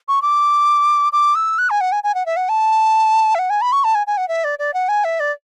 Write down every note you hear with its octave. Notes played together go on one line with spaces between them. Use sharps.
C#6
D6
D6
E6
F#6
G#5
F#5
G#5
G#5
F#5
E5
F#5
A5
E5
F#5
G#5
B5
C#6
A5
G#5
G#5
F#5
E5
D5
D5
F#5
G#5
E5
D5